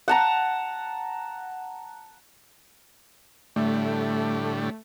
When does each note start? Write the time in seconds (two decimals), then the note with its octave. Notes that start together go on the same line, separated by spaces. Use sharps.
0.08 F#5 A5 A#5
3.56 A2 D3 G3 A3